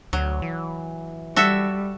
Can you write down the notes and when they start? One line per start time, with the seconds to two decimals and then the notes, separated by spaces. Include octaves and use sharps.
0.13 D2 F#3
0.42 E3
1.36 G3 F#4 A4 E5